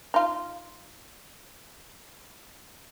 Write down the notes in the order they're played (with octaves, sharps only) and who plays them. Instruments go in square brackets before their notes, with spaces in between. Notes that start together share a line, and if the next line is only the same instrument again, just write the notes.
[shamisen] D#4 F4